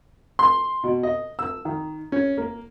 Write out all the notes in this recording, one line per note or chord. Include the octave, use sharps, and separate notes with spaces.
C6
B2
D#5
E6
D#3
C#4
A#3